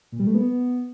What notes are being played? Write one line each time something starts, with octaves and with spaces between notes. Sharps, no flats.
A#2
G3
A3
B3